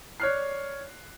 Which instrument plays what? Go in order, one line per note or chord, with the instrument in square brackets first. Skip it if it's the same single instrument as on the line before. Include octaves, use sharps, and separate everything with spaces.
[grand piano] C#5 D5 F6 F#6 C7